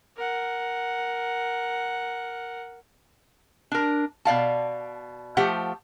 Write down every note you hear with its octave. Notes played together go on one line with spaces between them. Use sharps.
A#4 F#5
D4 A#4
B2 D5 F5 A5
F3 A3 G4 C5 F#5